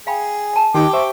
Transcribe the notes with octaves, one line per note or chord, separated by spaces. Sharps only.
G#4 F5 G5 B5
F#5 A5
D#3 D#4 G4 G5 D6
C5 E5 C#6